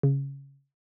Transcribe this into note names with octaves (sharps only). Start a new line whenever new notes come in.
C#3